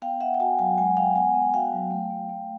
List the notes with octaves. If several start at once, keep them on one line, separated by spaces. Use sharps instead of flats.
B3 F5 G5
B3 E5 F#5
G5
F#4 F#5 G#5
F#3 F5 G5
G#3 F#5 G#5
G#3 F5 G5
B3 F#5 G#5
B3
F#5
F#4 F5 G5
F#3
A3
A3
A3